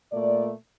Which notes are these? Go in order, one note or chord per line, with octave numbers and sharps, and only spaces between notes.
A#2 A3 D5